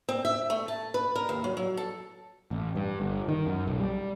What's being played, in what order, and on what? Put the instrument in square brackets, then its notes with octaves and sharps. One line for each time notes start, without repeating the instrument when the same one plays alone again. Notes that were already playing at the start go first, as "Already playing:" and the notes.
[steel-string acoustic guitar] C4
E5
A3
A5
B4
A#4
D#2
F#3
F#3
A4
[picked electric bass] A1
G2
G1
D#3
F#2
B1
G3